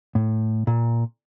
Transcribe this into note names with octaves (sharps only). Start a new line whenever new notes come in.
A2
A#2